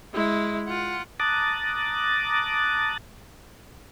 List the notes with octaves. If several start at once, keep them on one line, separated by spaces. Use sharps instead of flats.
G#3 E4
F4 F#5
A5 A#5 D6 D#6 F#6 A6